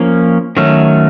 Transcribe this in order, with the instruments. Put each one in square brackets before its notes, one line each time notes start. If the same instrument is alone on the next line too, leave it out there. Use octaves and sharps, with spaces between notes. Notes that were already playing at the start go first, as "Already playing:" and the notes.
Already playing: [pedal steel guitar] F3 A#3 C#4
D#3 F#3 A3 C#4